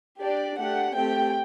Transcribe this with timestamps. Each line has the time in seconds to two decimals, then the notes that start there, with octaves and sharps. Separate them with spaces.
0.21 D4 G4 D5
0.58 A3 D4 G4 F#5
0.93 A3 C4 G4 G5